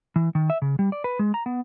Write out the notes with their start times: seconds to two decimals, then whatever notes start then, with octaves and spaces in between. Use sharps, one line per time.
0.16 E3
0.35 D#3
0.50 E5
0.62 C#3
0.79 G3
0.92 D5
1.04 B4
1.19 G#3
1.34 A#5
1.46 B3